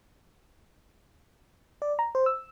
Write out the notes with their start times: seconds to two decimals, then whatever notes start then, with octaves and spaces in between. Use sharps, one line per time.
1.82 D5
1.99 A#5
2.15 C5
2.26 E6